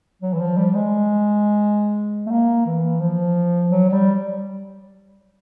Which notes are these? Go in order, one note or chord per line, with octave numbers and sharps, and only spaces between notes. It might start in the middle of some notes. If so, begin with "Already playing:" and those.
F#3
E3
F3
G3
G#3
A3
A#3
E3
F3
F#3
F#3
G3